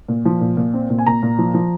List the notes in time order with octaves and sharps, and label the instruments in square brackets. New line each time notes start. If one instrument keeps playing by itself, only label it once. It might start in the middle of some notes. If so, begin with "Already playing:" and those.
[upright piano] A#2
F3
A#2
A#2
C4
A#2
G#5
A#2 A#5
A#2
F3
F3